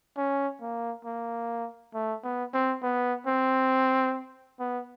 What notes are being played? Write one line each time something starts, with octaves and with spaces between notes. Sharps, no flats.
C#4
A#3
A#3
A3
B3
C4
B3
C4
B3